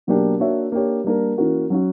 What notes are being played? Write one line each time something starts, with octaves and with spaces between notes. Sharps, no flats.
B2 F#3 A#3 D4 G4
A#3 D4 F#4 C#5 E5
A#3 D4 G4 C#5
G3 A#3 D4 A#4
E3 A#3 C#4 F#4 A#4
F#3 C#4 F#4